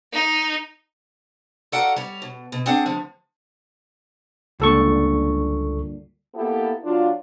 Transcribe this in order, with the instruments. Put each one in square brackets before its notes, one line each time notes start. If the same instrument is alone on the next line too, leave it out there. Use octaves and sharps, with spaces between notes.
[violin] D#4
[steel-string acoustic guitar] F#4 A4 A#4 D5 F5 F#5
G3 C#5
B2
B2
C4 D4 G#4 D5 F#5
A2 D3 F3
[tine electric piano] C#2 A4 C#6 [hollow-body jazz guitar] G2 A#2 D3
[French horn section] A#3 B3 E4 G4 A4
F#3 D4 F4